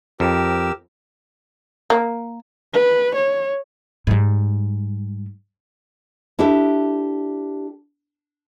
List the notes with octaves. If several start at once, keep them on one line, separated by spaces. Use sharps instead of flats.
F2 G4 A#4 E6
A#3
B4
C#5
G#2 G3
D4 E4 G4 A4 E5